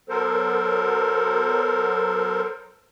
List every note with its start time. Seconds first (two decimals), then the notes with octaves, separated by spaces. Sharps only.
0.09 F#3 B3 A4 A#4 C5